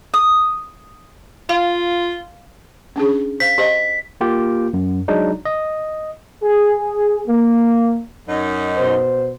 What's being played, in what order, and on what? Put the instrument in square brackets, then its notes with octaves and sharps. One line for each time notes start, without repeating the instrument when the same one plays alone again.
[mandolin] D#6
[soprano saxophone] F4 [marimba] F5
[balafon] C#4 D4 G#4
[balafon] C5 F5 [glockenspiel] B6
[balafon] G4 C5 D#5
[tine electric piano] A#3 F4 G4 G5
F#2
F#3 G#3 D4 D#4
D#5
[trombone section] G#4
A#3
[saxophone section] F#2 D#4
[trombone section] B2 C5